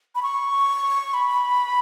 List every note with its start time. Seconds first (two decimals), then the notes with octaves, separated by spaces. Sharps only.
0.15 B5
0.23 C#6
1.14 B5